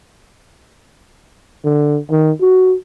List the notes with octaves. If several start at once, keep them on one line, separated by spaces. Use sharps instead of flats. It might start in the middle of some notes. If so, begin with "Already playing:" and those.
D3
D#3
F#4